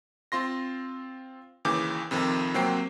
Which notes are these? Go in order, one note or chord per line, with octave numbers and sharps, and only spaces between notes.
C4 F4 C6 A#6
D#2 C#3 E3 D6 G6
F2 C3 D#3 F3
C3 F#3 A#3 C4 G5 C7